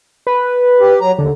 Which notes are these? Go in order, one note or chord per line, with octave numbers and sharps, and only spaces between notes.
B4
G4
F#3 A#5
D#2 D3